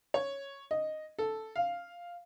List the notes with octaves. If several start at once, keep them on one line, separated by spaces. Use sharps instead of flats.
C#5
D#5
A4
F5